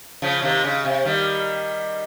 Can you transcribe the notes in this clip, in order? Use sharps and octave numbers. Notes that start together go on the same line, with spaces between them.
C#3 F3
C3 D#3
C#3
C3
D#3 G3